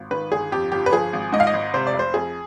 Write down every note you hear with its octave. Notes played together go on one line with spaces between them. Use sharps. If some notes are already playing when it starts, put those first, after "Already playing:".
Already playing: G#1
D#3 B4
G1 G#4
F2 G4
G1 G4
B4
F3 G#4
G#1
G#2 D#5
F5
D#5
G#1
C3 C5
D5
F1
C5
F2 G#4